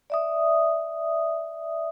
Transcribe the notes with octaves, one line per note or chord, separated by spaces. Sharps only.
D5 E5 D#6